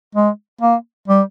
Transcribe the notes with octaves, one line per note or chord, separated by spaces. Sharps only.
G#3
A#3
G3